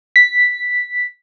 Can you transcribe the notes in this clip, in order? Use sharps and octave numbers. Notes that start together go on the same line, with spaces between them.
B6